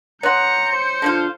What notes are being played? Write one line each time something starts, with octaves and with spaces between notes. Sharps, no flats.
B3 C#5 F#5 A#5 C6 G6 C#7
C5
D3 F3 F4